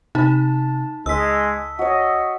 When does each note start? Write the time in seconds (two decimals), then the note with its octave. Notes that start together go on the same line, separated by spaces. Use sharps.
0.15 C3 D#4 A5 B5
1.06 C#2 G#3 D#5 E6 B6
1.79 F#4 C#5 D#5